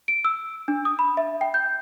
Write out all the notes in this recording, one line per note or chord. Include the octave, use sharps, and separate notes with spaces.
D7
E6
D4
D#6
B5
E5
G5
G6